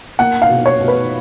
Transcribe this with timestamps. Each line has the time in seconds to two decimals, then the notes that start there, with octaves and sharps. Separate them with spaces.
0.19 A#3 F#5
0.42 F5
0.50 B2
0.66 C#5
0.80 B2
0.88 B4